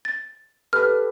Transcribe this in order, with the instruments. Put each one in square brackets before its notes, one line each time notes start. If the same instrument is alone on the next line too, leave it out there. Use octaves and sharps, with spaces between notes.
[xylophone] A6
[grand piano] G4 A4 B4 [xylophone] F6